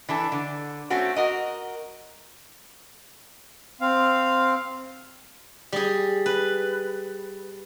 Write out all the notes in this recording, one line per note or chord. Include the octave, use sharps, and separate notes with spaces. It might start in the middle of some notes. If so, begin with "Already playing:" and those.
E3 D4 A4
D3
A3 C4 C#4 F#4
F#4 A#4 D#5
C4 F5
G3 G#4
B4